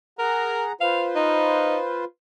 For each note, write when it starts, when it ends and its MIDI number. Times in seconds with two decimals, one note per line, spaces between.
0.19 0.72 68
0.19 0.64 70
0.19 0.72 78
0.19 0.72 82
0.81 2.05 65
0.81 2.05 71
0.81 2.05 72
0.81 1.04 77
1.16 1.78 63